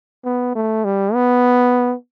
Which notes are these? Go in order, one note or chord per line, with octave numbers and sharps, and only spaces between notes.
B3
A3
G3
B3